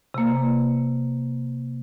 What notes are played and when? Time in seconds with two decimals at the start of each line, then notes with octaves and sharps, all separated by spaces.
0.14 C3 A#3